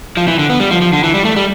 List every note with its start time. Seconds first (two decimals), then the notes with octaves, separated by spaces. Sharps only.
0.17 F3
0.28 E3
0.39 D3
0.50 B3
0.60 G3
0.71 F3
0.82 F3
0.93 D3
1.04 E3
1.14 G3
1.25 A3
1.36 G3